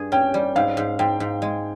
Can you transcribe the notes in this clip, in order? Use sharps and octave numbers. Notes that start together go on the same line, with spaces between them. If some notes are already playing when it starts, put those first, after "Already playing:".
Already playing: G2 G#4
C#4 G5
G3
G#2 F5
G#2
G#2 G5
G#2
G#3